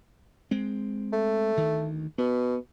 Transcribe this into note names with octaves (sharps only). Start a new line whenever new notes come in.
G#3 C4
A3
D2 D#3
B2 B3